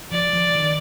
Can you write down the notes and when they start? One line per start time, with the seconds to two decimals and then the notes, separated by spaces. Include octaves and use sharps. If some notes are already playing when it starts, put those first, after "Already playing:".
0.11 F3 D5
0.33 F3
0.55 D#3